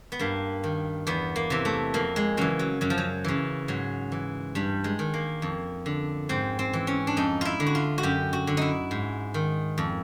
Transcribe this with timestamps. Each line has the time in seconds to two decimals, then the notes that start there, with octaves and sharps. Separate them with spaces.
0.12 B3
0.19 G2 A#3
0.64 D#3
1.07 E2 B3
1.36 A#3
1.50 C3 E3
1.65 A3
1.94 F2 A#3
2.16 G#3
2.37 C#3 E3 F#3
2.59 F#3
2.81 F#2 F#3
2.90 F3
2.98 F#3
3.24 C#3 E3
3.68 G#2 F#3
4.12 E3
4.55 G2 G3
4.84 G#3
4.99 D#3
5.14 A#3
5.42 F2
5.86 D3
6.29 G#2 C4
6.59 C4
6.73 E3
6.87 C#4
7.07 D4
7.17 F2 D#4
7.41 E4 F4
7.60 D3
7.66 F#4
7.75 F4
7.98 F#4
8.03 F#2 G4
8.33 F#4
8.47 D3
8.57 D#4 E4
8.91 G#2
9.34 D#3
9.78 F2